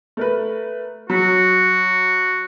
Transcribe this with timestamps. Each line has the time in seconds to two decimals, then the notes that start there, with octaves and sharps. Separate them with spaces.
0.17 A3 A#4 B4
1.10 F#3 F#4 B6